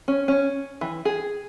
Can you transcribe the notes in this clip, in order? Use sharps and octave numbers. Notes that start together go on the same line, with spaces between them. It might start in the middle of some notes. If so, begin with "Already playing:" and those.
C#4
C#4
E3
G#4